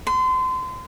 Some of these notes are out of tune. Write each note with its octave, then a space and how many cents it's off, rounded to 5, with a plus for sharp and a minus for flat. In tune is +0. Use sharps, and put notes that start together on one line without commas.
C6 -30